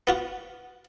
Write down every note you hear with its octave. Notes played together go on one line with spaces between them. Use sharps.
B3 F4 F#4